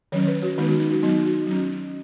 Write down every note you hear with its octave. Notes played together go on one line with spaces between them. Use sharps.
D#3 F#3 C#4 C#5
B4
F#4
D#3 G#3 B3 D#4
F#4
D#4
F#4
F#3 B3 D#4
F#4
F#3 C#4